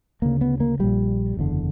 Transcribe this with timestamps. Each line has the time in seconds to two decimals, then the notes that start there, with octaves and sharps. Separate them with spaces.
0.22 D2 C#3 A#3
0.41 B3
0.60 A#3
0.79 A#1 A#2 G3
1.37 F#1 E2 D3